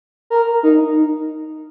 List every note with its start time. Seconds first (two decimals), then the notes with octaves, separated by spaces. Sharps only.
0.30 A#4
0.63 D#4